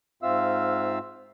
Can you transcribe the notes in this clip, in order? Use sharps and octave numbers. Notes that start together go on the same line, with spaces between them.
G#2 C4 F4 E5 F5 E6